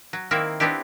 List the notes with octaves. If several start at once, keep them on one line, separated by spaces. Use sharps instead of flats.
F#3
D#3 A#3 C4 E4 E5
B3 C4 D4 E4 G4